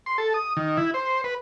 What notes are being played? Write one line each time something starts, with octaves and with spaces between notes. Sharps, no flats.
C6
A4
D#6
D#3
E4
C5
B4